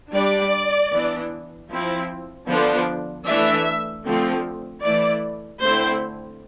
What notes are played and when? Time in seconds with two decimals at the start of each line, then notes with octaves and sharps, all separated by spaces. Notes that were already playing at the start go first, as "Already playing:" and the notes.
0.13 G3 D4 D5
0.91 E3 B3 D4
1.70 F3 C4 E4
2.48 D3 F3 B3 D4
3.26 E3 A3 D4 E5
4.05 D3 F3 A3 C4
4.83 E3 A3 E4 D5
5.61 D3 A3 C4 E4 C5